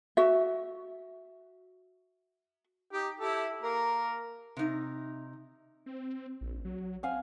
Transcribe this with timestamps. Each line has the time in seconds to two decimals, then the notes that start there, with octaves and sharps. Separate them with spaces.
0.17 F#4 E5
2.92 D#4 G4 G5
3.20 E4 G4 A4
3.63 A#3 A#4
4.57 C3 D#4
5.86 C4
6.41 A#1
6.65 F#3
7.03 C4 F5 F#5 G#5